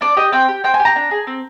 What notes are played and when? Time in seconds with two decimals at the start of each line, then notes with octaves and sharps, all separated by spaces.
0.01 D4 D5
0.17 G4 D#5
0.32 C4 G5
0.49 G4
0.64 C4 G5
0.74 G#5
0.79 G4
0.85 A#5
0.96 D4
1.11 G#4
1.27 C4